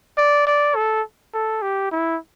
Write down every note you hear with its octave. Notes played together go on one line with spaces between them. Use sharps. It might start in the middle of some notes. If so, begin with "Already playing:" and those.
D5
D5
A4
A4
G4
E4